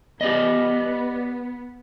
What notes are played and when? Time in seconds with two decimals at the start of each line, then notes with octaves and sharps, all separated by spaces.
0.21 B3 G4 D5 D#5